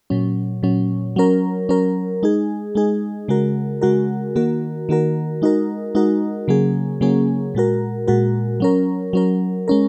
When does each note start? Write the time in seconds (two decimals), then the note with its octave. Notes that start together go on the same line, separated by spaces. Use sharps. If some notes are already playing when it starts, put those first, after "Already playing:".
0.10 A#2 F#3 C#4
0.63 A#2 F#3 C#4
1.16 F#3 C#4 A#4
1.69 F#3 C#4 A#4
2.23 G#3 D#4 G#4
2.75 G#3 D#4 G#4
3.28 C#3 G#3 F#4 A#4
3.81 C#3 G#3 F#4 A#4
4.36 D#3 A#3 F#4 A#4
4.89 D#3 A#3 F#4 A#4
5.42 G#3 D#4 F#4 A#4
5.95 G#3 D#4 F#4 A#4
6.48 C#3 F#3 A#3 C#4 G#4
7.01 C#3 F#3 A#3 C#4 G#4
7.55 A#2 G#3 F#4 A#4
8.07 A#2 G#3 F#4 A#4
8.60 F#3 C#4 A#4
9.13 F#3 C#4 A#4
9.68 G#3 C#4 A#4